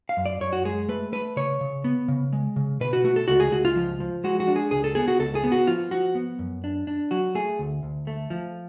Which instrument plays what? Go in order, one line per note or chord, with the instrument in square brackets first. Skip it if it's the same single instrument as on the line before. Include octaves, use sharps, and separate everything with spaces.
[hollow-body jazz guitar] F5
F#2
D5
F#2 C#5
F#4
G#3 G#4
A3 B4
A3 B4
C#3 C#5
C#3
B3
C#3
G#3
C#3
B2 B4
F#4
A3 F#4
A4
C#2 F#4
G#4
C#2 F#4
F4
F3
F3
G#3 F#4
F#4
D4
G#4
C#2 G#4
A4
B3 G#4
F#4
C#2 A4
G#4
B3
F#4
F3 F4
F3 F#4
B3
F#2
D4
D4
F#3 F#4
A3 G#4
D2
D2
A3
F3